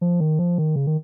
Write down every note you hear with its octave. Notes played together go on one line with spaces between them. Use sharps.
F3
D#3
F3
D#3
C#3
D#3